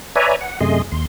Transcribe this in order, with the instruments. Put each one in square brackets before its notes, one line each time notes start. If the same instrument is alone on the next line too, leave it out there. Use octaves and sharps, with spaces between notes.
[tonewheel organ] B4 C#5 D5 E5 G#5 A#5
F#5
F#2 C3 A3 G#4 D#5 C6
D#2 C6